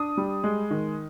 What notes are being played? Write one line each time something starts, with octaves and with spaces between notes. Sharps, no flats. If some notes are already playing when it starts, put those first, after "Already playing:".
Already playing: D4 D#6
G3
G#3
D#3